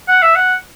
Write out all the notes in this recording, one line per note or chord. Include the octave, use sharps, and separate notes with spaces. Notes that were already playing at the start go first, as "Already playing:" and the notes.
F#5
E5
F#5